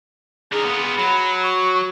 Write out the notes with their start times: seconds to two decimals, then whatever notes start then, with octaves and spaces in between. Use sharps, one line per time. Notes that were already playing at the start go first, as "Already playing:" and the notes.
0.52 D3 G#4 A#4
0.64 B3 F4
0.98 F#3 B5
1.43 C#6